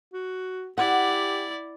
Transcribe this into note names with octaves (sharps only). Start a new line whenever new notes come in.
F#4
E4 G4 D5 F#5